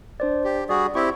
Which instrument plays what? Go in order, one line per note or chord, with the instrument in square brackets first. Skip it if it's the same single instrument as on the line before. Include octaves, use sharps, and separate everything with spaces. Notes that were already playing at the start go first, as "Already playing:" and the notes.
[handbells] D4 C5 D5
[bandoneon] G4
[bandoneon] G3 F#4 G#4 [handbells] D5
[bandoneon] C4 E4 G4 [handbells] C#6